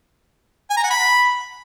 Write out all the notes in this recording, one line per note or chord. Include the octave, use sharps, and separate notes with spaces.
G#5
A#5
F#5
B5